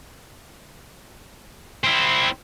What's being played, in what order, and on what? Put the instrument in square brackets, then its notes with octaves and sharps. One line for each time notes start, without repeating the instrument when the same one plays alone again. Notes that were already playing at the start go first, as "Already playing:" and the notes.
[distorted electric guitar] C4 E4